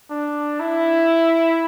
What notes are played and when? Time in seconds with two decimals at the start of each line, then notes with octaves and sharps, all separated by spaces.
0.10 D4
0.60 E4